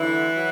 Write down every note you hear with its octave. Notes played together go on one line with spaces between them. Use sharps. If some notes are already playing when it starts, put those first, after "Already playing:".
Already playing: D2 D3 E3 F#3 E4
F#3